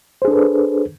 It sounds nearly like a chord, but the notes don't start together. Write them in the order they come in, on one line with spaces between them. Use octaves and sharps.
C5 G#4 D4 A4 B4